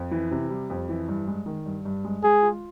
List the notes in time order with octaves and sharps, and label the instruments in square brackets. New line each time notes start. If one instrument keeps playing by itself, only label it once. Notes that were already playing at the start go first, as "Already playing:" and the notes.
Already playing: [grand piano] F2
E3
C3
G3
F2
E3
G2
G#3
D#3
G2
G2
G#3
[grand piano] G#3 [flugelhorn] G#4
[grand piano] F4